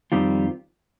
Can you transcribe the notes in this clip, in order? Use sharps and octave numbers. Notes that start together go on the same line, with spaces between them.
F2 D#3 G3 C4 F4